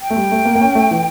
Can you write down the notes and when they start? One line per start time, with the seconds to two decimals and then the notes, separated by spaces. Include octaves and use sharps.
0.01 G5
0.10 A3
0.16 G3
0.31 A3
0.45 A#3
0.56 A#3
0.61 C#4
0.75 A3
0.91 E3